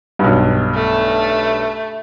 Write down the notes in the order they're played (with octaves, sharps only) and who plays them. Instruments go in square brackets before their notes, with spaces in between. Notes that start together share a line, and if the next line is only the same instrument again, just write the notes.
[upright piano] B1 G2
[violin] A3